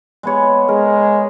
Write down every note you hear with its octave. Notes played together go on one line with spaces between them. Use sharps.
G#3 B3 C#5
G#3 A#4